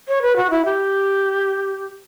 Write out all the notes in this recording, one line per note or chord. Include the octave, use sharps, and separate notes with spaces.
C#5
B4
F#4
E4
G4